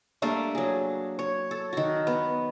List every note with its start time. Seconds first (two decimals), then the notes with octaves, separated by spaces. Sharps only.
0.22 G3 A3 A#3 D4
0.55 F#3 G#4
1.19 C#5
1.51 A4
1.73 D#3 F#4
2.07 B3